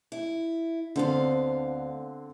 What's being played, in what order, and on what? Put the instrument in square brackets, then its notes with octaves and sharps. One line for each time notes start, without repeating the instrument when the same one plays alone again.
[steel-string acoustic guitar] E4
[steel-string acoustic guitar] D2 B3 F5 [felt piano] D3 C4